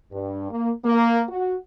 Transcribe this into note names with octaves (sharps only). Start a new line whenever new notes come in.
G2
A#3
A#3
F#4